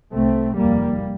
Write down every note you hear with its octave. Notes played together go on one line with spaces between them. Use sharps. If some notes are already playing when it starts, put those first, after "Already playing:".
C2 C3 A3 C4
F1 D#2 G3 A#3